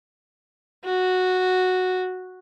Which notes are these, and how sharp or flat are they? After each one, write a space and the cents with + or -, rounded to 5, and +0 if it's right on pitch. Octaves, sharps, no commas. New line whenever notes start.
F#4 -5